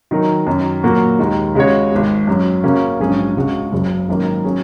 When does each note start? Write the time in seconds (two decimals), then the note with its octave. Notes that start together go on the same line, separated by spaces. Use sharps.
0.11 D#3 F#3 D#4 A#4
0.47 F#2 D#3 F#3
0.83 A#2 F#3 A#3 F#4
1.19 D#2 D#3 G#3
1.55 C#3 G#3 F#4 C#5
1.92 G#1 G#2 G#3
2.27 F#2 F#3 C#4
2.63 C#3 A#3 C#4 F#4
3.00 A#1 G#2 F#3 C#4 G#4
3.37 C#2 C#3 G#3 F#4
3.72 F#1 F#2 C#3 F#3
4.08 G#1 F#2 D#3 A#3
4.44 F#3 C#4 G#4